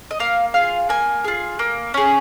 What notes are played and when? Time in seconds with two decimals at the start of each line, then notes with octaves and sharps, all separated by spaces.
0.11 D#5
0.20 A#3 F5
0.54 F4 G#4 F5
0.89 A#3 G#5
1.24 F4 G#4
1.59 A#3
1.94 C#4 G#4